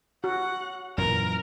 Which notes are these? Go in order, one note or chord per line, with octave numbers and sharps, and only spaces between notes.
F#4 F#5
F#2 A#2 E3 A#4